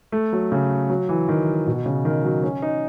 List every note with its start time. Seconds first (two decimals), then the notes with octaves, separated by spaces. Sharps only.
0.12 A3
0.33 F#3
0.52 C#3
0.90 F#3
1.09 E3
1.29 D#3
1.67 B2
1.86 C#3
2.05 D#3
2.25 F#3
2.43 C#4
2.62 D#4